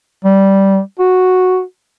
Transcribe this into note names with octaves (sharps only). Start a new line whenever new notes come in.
G3
F#4